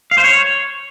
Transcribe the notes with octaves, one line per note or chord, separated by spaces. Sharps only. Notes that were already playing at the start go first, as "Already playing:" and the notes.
F5
C5
C#5